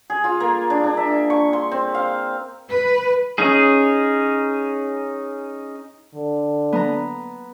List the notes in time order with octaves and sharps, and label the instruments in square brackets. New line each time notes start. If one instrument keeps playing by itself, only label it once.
[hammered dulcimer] G#4
F4
A#3
D4
D4
E5
C#6
C6
C4
F5
[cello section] B4
[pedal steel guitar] C#4 D#4 G#4
[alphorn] D3
[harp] B3 A#5